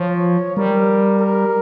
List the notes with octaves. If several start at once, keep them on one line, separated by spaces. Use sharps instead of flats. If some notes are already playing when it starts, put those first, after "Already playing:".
Already playing: F3 C#5
G3 A#4
A#4